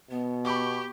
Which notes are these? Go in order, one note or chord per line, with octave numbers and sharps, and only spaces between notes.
B2 B3
G4 B5 C#6 D6